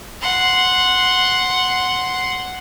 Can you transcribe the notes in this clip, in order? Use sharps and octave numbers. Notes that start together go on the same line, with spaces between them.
F#5 C6